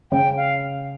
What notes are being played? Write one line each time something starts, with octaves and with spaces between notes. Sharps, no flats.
C#3 G5
F5